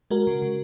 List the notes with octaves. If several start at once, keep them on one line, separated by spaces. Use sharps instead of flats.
G#3 F#4 A#4
C#3
C#3